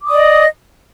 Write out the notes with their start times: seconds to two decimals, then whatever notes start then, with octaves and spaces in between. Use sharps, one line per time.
0.01 D6
0.06 D#6
0.10 D5
0.15 D#5